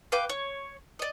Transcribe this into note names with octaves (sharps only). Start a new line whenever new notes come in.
B4 F5 G5 D6
C#5
D5 D#5